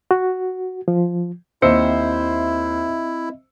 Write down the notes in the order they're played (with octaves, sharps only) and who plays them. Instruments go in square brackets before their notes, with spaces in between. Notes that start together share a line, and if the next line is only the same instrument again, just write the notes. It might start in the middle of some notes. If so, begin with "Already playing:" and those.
[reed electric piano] F#4
F3
[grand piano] D#2 E6 C#7 [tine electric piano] C4 D#5 E5 [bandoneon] E4 [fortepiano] C5